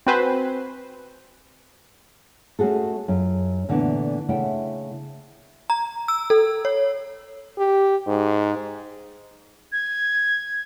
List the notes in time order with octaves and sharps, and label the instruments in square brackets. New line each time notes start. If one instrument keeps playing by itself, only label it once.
[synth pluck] C4 F#4 B4 C5 G#5
[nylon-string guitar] A3 C#4 D4 F#4 G#4 A4
F#2 F4
A#2 D3 E3 A3 B3
C#3 A3 E4 F#5 G5
[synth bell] A#5
E6
A4
C#5
[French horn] G4
G#2
[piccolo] G#6